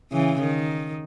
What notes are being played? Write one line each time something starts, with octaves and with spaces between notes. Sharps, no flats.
C#3 E3
D#3